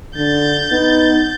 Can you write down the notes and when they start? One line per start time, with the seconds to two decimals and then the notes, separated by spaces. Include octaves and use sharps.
0.16 D3 G6 A6
0.71 B3 D#4